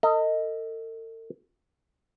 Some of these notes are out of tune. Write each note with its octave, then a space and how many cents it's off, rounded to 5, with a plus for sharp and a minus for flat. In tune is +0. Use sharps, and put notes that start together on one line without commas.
A4 +45 D#5 +10